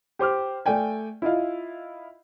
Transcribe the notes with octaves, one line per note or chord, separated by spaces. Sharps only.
G4 C5 D6 F6
A3 D5 G5 G#5
E4 F4 D#5 F5